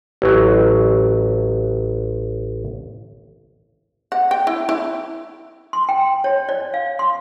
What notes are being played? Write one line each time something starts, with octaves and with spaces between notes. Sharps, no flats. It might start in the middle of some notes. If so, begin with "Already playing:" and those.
A1 F#3
F#5
G5
E4
E4
C6
G5
C#5
D5
F5
C6